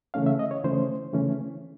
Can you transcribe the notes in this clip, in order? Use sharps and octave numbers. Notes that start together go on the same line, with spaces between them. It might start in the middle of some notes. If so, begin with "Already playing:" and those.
C#3 E3 A3 C#4 F5
E5
D#5
C#5
C#3 E3 A3 C#4 C5
C#3 E3 A3 C#4